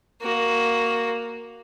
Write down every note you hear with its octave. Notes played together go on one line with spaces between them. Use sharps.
A#3 F#4